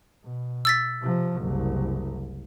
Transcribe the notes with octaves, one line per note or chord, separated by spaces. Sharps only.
B2
E6 A6 B6
C3 F3
F#1 C2